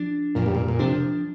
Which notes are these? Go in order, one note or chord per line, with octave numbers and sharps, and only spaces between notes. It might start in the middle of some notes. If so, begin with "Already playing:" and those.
Already playing: F3 D4
F2 A#2
G2
A#2
A#2
C3 F3 D4